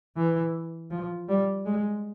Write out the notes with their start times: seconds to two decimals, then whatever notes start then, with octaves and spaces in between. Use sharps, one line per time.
0.16 E3
0.91 F3
1.29 G3
1.66 G#3